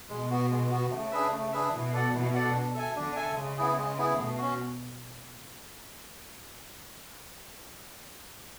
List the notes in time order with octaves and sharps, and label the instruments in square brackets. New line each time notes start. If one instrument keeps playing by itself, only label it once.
[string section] B2 [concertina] G#3
[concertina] B3 F#4
G#3
B3 F#4
[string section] C#3 [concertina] A3
[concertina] D4 G#4 B4 E5
A3
D4 G#4 B4 E5
[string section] B2 [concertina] E4
[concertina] A4 D5 F#5
[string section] B2 [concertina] E4
[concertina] A4 D5 F#5
D4
A4 E5 G#5
[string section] D3 [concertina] D4
[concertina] A4 E5 G#5
[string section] C#3 [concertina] G#3
[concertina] B3 E4 G#4
G#3
B3 E4 G#4
[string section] B2 [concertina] A3
[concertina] C#4 F#4